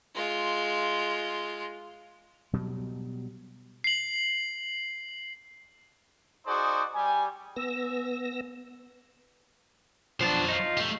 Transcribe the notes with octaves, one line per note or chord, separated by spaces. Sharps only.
G#3 F4
B2 F#3 G3
C7 F#7
D#4 F#4 G#4 C5 D5
G3 G4 G#5
B3 E6 A#6
F3 F#3 B3 D4 C5
D#4 F4
A3 G4